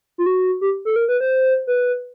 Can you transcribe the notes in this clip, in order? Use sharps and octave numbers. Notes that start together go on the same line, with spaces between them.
F4
F#4
G4
A4
A#4
B4
C5
B4